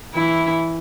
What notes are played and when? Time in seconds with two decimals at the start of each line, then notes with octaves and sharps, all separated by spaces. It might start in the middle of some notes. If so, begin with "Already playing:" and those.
0.14 E3 E4